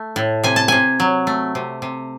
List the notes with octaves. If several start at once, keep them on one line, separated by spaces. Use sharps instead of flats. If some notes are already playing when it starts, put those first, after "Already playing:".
Already playing: A3
A2
C3 G#5
A5
C3 G#5
F#3
A3
C3
C3